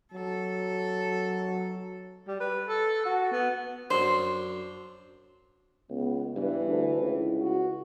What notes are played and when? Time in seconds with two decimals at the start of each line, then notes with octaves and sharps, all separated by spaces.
0.13 F#3 A4
2.28 G3
2.40 B4
2.67 A4
3.05 F#4
3.32 B3
3.90 F#2 D4 C5
5.89 C#2 B3
6.36 G2 E3 B4
6.67 D2 D4
6.97 C#2 E4
7.41 F#4